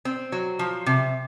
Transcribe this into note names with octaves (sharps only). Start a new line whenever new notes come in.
C4
F#3
F3
C3